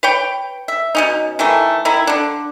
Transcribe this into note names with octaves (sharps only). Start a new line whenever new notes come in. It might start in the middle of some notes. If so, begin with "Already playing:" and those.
B4 C#5 G5
E5
B2 C#4 D#4
D#3 E3 A3
D#3 D#4 E4
D3 D4